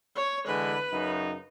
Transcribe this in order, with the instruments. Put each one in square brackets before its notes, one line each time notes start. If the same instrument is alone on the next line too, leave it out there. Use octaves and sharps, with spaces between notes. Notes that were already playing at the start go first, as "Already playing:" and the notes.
[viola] C#5
[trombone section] D3 E3 G#3 [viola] B4
[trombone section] F#2 C#3 D#4